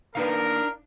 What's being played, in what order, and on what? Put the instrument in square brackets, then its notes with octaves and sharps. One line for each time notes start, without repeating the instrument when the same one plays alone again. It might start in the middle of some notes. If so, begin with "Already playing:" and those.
[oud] D#3 A#3 B4 [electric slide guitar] D4 D#4 F5 [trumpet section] A#4